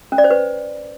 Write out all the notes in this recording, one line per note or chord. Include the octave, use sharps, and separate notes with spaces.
C#4
D5
C5
B4